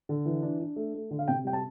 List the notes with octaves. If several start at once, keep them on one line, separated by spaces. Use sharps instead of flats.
D3
E3
D4
D4
A3
A3
D3
F5
C3 G5
G3 G5
A5